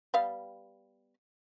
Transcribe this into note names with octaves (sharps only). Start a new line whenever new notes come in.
G3 B3 F5